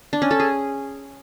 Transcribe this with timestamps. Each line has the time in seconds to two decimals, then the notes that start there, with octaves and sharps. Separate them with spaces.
0.13 D4
0.22 C#4
0.31 A4
0.40 G#4